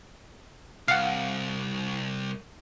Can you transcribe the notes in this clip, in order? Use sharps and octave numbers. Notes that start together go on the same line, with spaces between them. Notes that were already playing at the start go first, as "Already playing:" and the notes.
C2 F5 F#5